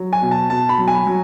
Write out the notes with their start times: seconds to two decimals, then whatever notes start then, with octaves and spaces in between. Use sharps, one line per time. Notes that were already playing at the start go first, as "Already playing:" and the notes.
Already playing: F#3
0.13 G#5
0.22 B2
0.31 A5
0.50 B2 A5
0.69 B5
0.78 F#3
0.88 G#5
1.07 F#3